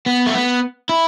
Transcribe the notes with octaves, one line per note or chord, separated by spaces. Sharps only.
B3
A3
B3
E4